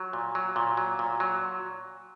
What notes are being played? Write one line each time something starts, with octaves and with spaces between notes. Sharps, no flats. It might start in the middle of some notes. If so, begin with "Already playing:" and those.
Already playing: F#3
A#2
F#3
A#2
F#3
A#2
F#3